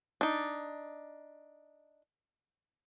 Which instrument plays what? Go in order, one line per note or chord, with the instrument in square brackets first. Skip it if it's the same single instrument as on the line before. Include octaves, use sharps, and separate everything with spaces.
[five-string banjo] D4 D#4